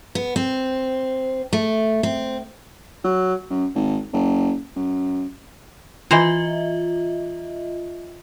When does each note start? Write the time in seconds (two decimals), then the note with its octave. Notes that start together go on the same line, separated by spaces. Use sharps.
0.15 B3
0.36 C4
1.53 A3
2.03 C4
3.04 F#3
3.50 F#2
3.75 G#1
4.13 F#1
4.76 F#2
6.11 E3 F4 C5 D#5 E5 A#5